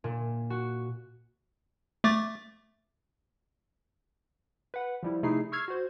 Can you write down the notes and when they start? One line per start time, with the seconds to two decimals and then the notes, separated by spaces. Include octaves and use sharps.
0.04 A#2
0.50 F#4
2.04 A3 D6 A6
4.74 B4 F#5
5.03 F3 G3 E4
5.23 C3 A3 D#4 E4 G#4 C7
5.52 C#6 E6 F6 G#6 C7
5.68 F#4 C5